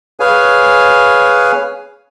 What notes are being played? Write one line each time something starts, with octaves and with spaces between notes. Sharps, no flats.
G#4 B4 C#5 F5 G#5